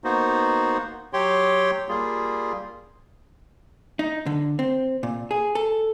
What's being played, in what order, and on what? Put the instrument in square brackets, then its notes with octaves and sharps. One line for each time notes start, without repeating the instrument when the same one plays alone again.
[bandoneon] A#3 B3 D#4 F#4 C5
F#3 G4 C#5 G5 C6
G3 A#3 F4 G#4
[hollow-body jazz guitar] D#4
D3
C4
A#2
G#4
A4